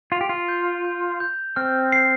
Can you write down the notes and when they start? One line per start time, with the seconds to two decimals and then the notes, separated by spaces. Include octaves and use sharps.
0.12 F4 F7
0.21 G4
0.29 F4
0.48 G6
0.85 G6
1.20 G6
1.56 C4 F6
1.92 C7